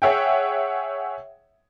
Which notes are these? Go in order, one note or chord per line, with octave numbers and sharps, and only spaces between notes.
G#4 C#5 E5 F#5 G5